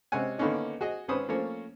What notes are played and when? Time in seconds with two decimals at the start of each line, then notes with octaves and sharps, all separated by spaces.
0.12 C3 G#3 C#4 F#5 G#5
0.38 D3 D#3 A#3 B3 C#4 D#4
0.81 F#4 G#4 D#5
1.08 G#1 C4 C#4 B4 C5 D#6
1.28 F3 A3 A#3 C#4 C#5